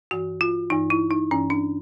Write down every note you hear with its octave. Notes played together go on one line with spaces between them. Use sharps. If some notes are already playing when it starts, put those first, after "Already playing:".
G2 E3 F#4
F4
G2 E3 D#4
E4
D#4
G2 E3 C#4
D4